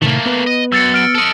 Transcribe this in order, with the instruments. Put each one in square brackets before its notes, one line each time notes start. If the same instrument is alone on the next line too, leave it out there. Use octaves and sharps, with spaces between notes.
[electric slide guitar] A2 C3 D#3 [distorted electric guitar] A3 A#3
[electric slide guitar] B3 B4
[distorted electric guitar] D#5
[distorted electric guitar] F#2 [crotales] E6 A6 C#7
[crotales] F6 D7
[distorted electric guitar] A4 D#5